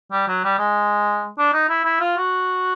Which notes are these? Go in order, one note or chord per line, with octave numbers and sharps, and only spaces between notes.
G3
F#3
G3
G#3
D4
D#4
E4
E4
F4
F#4